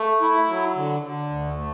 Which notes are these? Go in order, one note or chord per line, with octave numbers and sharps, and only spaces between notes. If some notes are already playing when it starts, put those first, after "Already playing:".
Already playing: A3
E4
F#3
D3
D3
D2
A3